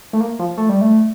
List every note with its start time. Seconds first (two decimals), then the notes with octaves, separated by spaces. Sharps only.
0.13 A3
0.21 A#3
0.39 F3
0.57 A3
0.69 G3
0.81 A3